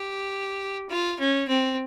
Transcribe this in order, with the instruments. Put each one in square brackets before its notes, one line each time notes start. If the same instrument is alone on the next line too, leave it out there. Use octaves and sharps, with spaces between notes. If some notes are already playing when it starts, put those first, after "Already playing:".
Already playing: [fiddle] G4
F4
C#4
C4